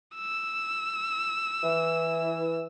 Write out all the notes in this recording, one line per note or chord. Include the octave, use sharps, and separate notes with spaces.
E6
E3